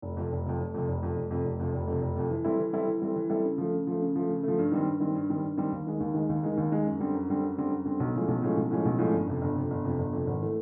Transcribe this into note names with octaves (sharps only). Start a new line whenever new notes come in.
F1
F2 C3
F1
F2 C3
F1
F2 C3
F1
F2 C3
F1
F2 C3
F1
F2 C3
F1
F2
C3
F1
F2 C3
E3
G3 C4 E4 A4
E3
G3 C4 E4 A4
E3
G3 C4 E4 A4
E3
G3 C4 E4 A4
C#3
F3 A3
C#3
F3 A3
C#3
F3 A3
C#3
F3 A3
G2
D#3 G3 C4
G2
D#3 G3 C4
G2
D#3 G3 C4
G2
D#3 G3 C4
D#2
D#3 G#3
D#2
D#3 G#3
D#2
D#3 G#3
D#2
D#3 G#3
F#2
D3 G3 C4
F#2
D3 G3 C4
F#2
D3 G3 C4
F#2
D3 G3 C4
B1
A2 F3 G#3 C#4
B1
A2 F3 G#3 C#4
B1
A2 F3 G#3 C#4
B1
A2 F3 G#3 C#4
G1
F2 C3
G1
F2 C3
G1
F2 C3
G1
F2 C3
G#1
E3 A3